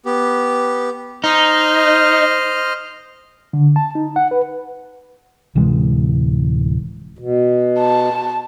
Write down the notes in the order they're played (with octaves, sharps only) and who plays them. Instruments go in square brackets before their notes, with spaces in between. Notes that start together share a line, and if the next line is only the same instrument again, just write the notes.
[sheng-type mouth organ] B3 G4
[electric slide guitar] D#4 [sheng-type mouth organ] C5 D#5 F6
[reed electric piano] D3
A5
D#4
F#5
B4
[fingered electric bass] D1 C3 E3 G#3
[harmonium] B2
[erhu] A5